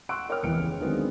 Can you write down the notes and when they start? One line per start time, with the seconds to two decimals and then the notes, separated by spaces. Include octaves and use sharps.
0.09 F#5 C6 C#6 E6 F#6 D7
0.29 A#4 C#5 G5 F6
0.43 F1 E3 B3 G5 C#7 D7
0.57 C#2
0.81 D3 D#3 F#3 G#3 B3 C4